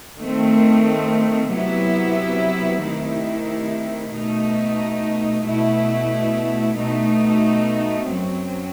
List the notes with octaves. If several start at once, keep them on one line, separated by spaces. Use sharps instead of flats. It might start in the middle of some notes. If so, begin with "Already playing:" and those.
D#3 A3 C4
C3 F#3 B3 E4
C3 D#3 A3 E4
B2 A3 D#4
B2 A3 E4
B2 A3 D#4
F#2 F#3 C4